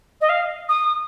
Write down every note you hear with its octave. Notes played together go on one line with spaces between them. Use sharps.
D#5
F5
D#6